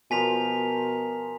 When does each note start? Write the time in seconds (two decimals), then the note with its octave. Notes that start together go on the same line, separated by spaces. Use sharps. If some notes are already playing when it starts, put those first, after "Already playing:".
0.11 B2 F3 A#4 G#5 D6 B6 F7